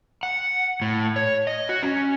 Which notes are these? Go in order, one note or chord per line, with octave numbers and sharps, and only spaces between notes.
F#5
A2
C#5
D#5
F#4
C#4